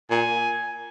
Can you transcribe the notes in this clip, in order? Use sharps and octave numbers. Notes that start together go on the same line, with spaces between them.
A#2 G#5